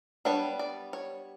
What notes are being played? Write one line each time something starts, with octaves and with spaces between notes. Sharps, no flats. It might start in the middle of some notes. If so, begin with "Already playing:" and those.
G3 B3 D4 C#5
D5
C#5